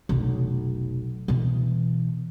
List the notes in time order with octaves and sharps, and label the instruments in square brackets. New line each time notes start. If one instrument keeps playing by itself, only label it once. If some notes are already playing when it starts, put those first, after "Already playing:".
[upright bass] F1 B1
B2 E3